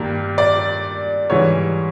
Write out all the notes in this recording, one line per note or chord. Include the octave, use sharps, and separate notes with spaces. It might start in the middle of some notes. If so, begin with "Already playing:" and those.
Already playing: G2 D#3 G3 A#3
D5
G#2 E3 G3 C#5